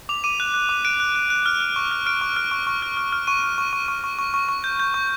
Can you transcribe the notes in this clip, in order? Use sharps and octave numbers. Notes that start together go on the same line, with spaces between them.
D6 F7
D6 D#7
F#6
F#6
D6
F#6 D7
F#6
F#6
F#6
F6
F6
C#6
F6
F6 D7
C#6
F6
C#6
C#6
F6
F6
F6
C#6 D#7
C#6
C#6
C#6
C#6
C#6
C#6
C#6
C#6
G6
G6
C#6